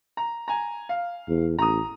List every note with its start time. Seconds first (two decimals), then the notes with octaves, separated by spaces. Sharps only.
0.17 A#5
0.48 G#5 A#5
0.89 F5
1.28 E2
1.59 A1 A#5 D#6